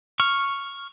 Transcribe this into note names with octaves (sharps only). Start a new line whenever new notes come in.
C#6 F6